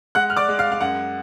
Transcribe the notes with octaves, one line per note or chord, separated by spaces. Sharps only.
G#3 F#5 F#6
F6
D5 D6
G#3
F5 F6
F5
F#2 F#5